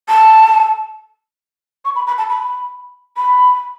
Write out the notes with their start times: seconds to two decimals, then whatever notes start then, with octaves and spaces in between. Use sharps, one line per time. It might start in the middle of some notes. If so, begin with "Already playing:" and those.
0.08 A5
1.85 C#6
1.95 B5
2.07 B5
2.18 A5
2.29 B5
3.17 B5